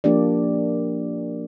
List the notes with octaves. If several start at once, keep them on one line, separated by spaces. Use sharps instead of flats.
F3 A#3 D4 G4 D5